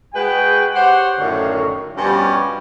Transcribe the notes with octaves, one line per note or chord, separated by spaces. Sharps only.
G#3 F#4 G#4 B4 G5
G4 C5 C#5 F#5
F#2 A2 D3 D#3 C#5 F5
G2 B2 F3 G3 C#4